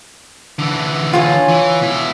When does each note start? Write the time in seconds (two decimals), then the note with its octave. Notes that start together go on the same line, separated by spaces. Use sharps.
0.59 D3 E3
1.13 F4 C#5 G#5
1.48 E3
1.82 B2 E4